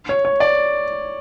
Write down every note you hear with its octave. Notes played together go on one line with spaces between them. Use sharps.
C#5
C#5
D5